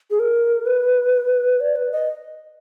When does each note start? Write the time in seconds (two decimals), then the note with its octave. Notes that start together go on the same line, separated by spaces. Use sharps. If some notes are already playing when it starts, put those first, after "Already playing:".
0.11 G#4
0.20 A#4
0.66 B4
1.60 D5
1.76 B4
1.92 D#5